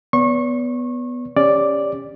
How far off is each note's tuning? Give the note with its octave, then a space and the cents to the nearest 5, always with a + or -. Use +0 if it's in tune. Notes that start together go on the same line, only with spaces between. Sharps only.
B3 +0 D5 -45 C#6 -30
C#4 +0 G4 +30 D5 +0